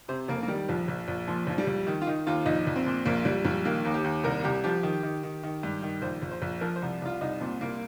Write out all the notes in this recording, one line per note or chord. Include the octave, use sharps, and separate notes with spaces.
C3 C5
F1 A#3
A#3
D#3 G3
A#1 F3
A#1
A#1
A#2 F3
A#1 F3
G3
A#1
D#3
F4
D#3 D#4
D#2 F4
A#1 D#4
A#1
C4
A#2
A#1 A#3
A#1 G3
A#1 G3
D#3 A#3
D#2
G4
D#2
C2 A#4
C2 G4
F3 G4
D#3
D#3
D#3
D#3
G2
D#3
A#1 C5
A#1
C5
A#1
F3 A#4
C5
C2
C2 F4
C2 D#4
A#2 C4
C2 A#3